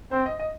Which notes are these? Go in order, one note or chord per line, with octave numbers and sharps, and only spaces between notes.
C4 C5
D#5
D#5